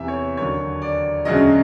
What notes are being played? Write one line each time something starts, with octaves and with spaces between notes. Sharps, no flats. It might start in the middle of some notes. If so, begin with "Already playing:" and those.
Already playing: E2 C3 E3 E5
C#5
D#2 D3 F#3 C#5
D5
E1 D2 C#3 F#3 D#5